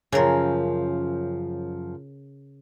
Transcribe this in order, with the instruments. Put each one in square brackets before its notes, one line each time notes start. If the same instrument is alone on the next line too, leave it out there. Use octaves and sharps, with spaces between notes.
[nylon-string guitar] F#2 F3 [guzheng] C#3 A#4